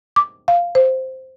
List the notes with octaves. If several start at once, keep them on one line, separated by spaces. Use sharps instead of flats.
D6
F5
C5